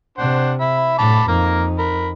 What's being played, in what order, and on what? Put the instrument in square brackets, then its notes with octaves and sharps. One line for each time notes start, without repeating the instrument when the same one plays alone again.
[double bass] C3 [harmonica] D4 C5 F#5
[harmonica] E5 B5
[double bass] A2 [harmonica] A5 B5 D6
[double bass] F2 D#4 [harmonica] A#3 A#5
[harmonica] A#4 B5